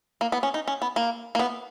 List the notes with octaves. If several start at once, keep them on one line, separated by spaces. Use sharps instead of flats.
A#3
B3
C#4
D#4
C#4
B3
A#3
A#3
B3